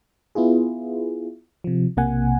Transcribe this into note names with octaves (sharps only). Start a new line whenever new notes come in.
B3 E4 F4 G#4
C3 F3
B1 C3 A#3 F#5 G#5